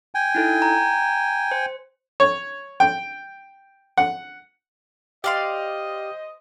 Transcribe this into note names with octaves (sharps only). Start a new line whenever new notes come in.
G5 G#5
D#4 E4 A4
A#5
C5
C#5
G5
F#5
G4 C5 D5 D#5 F5 C6